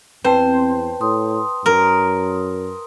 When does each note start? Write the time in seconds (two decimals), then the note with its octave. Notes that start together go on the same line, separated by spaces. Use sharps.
0.24 E2 C4 B4 C5 G5 A5
1.01 A2 C6 D#6
1.66 F#2 A#4